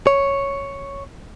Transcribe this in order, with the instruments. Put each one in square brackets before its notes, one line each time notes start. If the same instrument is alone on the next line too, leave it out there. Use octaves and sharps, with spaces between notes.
[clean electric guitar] C#5